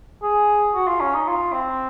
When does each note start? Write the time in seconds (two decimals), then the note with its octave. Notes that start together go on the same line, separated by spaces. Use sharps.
0.22 G#4
0.75 F#4
0.87 F4
1.00 C#4
1.14 D#4
1.28 F4
1.53 C4